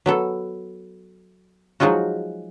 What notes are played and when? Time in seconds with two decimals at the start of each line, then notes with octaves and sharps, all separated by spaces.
0.06 F#3 B3 A4
1.80 F3 F#3 G#3 D#4 F4 F#4